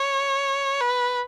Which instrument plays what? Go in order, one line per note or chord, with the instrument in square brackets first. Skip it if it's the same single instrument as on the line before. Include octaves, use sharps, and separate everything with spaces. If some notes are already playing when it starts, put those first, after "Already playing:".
Already playing: [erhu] C#5
B4